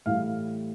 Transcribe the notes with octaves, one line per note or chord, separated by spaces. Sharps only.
A2 E3 G3 F5